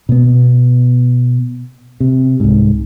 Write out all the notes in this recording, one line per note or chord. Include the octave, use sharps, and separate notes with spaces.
B2 B3
C3
C2 G#2